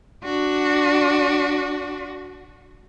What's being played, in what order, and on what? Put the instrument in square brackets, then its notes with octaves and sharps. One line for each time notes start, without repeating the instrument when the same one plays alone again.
[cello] D4 F#4